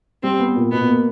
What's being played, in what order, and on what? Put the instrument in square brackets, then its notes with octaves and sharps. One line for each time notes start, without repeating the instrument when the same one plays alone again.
[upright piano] G3 [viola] C4
[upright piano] B3
A#2
[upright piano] B2 [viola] B3
[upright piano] A#3